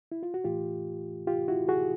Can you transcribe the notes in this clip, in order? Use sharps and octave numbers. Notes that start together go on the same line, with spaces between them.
E4
F4
F#4
A2 E3 A3 F4 G4
F4 G4
E4 F#4
F#4 G#4